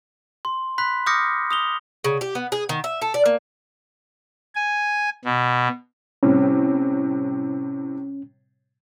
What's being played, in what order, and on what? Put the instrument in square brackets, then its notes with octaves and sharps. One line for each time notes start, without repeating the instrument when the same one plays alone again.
[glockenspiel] C6
B5 C6 F#6 B6
D6 D#6 F6 G6 A#6 C#7
D#6 F7 G7
[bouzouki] C#3
G4
B3
G#4
D#3
E5
A4
D5
A#3
[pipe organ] G#5
B2
[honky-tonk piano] A2 C3 G3 [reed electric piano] C#4